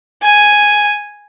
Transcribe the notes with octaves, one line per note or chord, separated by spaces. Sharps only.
G#5